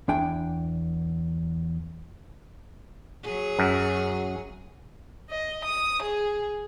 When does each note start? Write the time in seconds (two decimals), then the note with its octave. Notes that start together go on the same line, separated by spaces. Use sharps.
0.08 E2 D4 G5 G#5
3.24 F#3 G#4
3.59 F#2
5.30 D#5
5.65 D#6
6.02 G#4